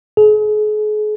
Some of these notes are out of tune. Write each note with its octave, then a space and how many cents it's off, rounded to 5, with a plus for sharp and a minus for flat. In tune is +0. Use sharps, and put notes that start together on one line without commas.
G#4 +40